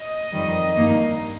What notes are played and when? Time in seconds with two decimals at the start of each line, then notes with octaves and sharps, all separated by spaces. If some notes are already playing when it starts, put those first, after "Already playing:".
Already playing: D#5
0.32 F2 D#3 G3
0.76 G2 D#3 A#3 D#4